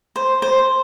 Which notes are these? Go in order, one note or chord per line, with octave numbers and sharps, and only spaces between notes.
C5
C5